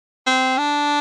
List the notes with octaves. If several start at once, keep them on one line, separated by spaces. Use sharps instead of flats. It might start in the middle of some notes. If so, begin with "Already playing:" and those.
C4
D4